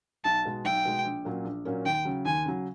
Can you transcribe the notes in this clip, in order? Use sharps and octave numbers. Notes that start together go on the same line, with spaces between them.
B1 A5
B2 G#3
B1 G5
B2 G#3
A#1
A#2 F#3 A#3 C#4
A#1
A#2 F#3 A#3 C#4
D#2 G5
C#3 F#3
D#2 G#5
C#3 F#3